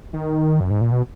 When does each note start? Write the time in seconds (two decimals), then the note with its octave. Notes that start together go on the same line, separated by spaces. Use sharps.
0.13 D#3
0.60 F#2
0.70 G#2
0.81 A#2
0.92 B2